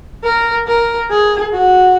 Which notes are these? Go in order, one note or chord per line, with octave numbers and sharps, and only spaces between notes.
A#4
A#4
G#4
F#4